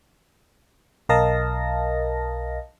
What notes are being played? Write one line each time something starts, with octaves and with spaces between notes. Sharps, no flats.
B1 A#4 D#5 F5 A5 A#6